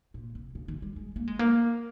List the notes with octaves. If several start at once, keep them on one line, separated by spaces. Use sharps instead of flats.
A#2
C3
C#3
D#3
G3
G#3
A#3
G#3
A#3